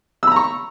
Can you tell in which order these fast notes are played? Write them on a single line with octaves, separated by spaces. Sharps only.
E6 B5 A#5 C#6